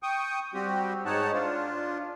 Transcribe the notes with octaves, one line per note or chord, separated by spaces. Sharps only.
G5 C#6 D#6
G3 C4 F#4 G4
G#2 D#4 C#5 F#5 A5
D4 F4